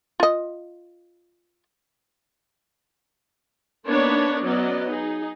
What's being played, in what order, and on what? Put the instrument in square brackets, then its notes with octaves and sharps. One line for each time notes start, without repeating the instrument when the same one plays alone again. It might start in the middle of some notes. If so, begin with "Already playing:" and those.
[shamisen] F4 D#5
[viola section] A#3 B3 D4 D#4 B4 C#5
F#3 B3 C#4 D5 D#5
D#4 G#4